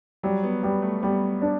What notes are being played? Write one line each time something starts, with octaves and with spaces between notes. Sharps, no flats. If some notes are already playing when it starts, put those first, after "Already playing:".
F#3 G3
B3
G3 B3
A3
G3 B3
D4